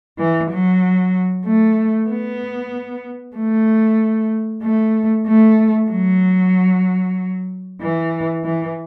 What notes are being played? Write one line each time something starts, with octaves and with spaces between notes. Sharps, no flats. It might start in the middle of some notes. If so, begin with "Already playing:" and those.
E3
F#3
A3
B3
A3
A3
A3
F#3
E3
E3